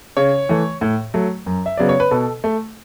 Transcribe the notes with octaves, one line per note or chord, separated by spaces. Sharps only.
C#3 C#5
E3 A3
A2
F#3 A3
F#2
E5
C#3 F#3 B3 D5
C#5
B4
B2 A4
A3